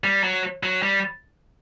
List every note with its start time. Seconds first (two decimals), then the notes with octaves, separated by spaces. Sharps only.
0.04 G3
0.24 F#3
0.63 F#3
0.83 G3